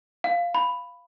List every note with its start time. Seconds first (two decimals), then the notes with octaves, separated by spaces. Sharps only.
0.24 F5
0.55 B5